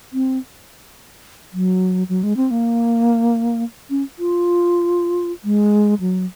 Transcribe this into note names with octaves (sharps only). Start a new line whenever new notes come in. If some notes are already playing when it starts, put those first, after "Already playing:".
C4
F#3
F#3
G#3
C4
A#3
C#4
F4
G#3
F#3